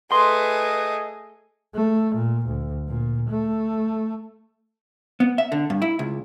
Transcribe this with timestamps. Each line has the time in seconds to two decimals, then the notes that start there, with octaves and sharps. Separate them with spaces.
0.12 A3 G#4 B4 D#5 C6
1.75 A3
2.15 A#2
2.46 D2
2.88 A#2
3.29 A3
5.20 B3
5.38 E5
5.52 D3
5.70 G2
5.82 E4
5.99 C#2